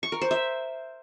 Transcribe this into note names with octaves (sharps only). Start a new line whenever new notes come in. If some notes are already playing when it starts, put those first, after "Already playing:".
C#6
A#4
C5
E5